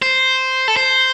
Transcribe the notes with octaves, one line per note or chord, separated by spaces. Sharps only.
C5
A4
C5